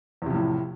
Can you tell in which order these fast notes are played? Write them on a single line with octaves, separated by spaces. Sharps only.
E2 C3 F3 A2